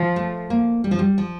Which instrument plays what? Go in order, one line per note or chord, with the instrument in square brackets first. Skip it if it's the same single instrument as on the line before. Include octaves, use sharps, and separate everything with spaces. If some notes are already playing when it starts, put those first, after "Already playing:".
Already playing: [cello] F3
[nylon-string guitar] A3
A#3
G3
F3
G3
F3